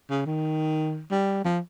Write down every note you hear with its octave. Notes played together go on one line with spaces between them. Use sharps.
C#3
D#3
G3
F3